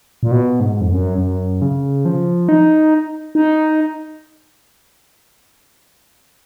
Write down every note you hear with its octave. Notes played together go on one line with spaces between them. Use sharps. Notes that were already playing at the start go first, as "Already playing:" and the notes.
A#2
B2
G#2
F2
F#2
F#2
C#3
F3
D#4
D#4